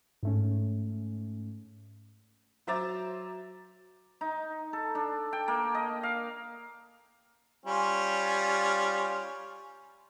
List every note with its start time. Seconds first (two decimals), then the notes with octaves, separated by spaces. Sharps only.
0.23 G#2 A3 C#4
2.67 F#3 C5 E5 A#5 D6 A6
4.21 D#4
4.73 A4
4.95 D4
5.33 G5
5.48 A#3
5.75 D#5
6.03 F5
7.66 G3 C#4 F4